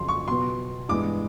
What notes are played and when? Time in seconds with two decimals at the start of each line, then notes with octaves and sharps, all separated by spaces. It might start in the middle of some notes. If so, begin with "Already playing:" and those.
Already playing: F2 C#3 F#3 C6
0.08 C#6
0.28 B2 F#3 B3 C6
0.89 G2 E3 G#3 B3 D6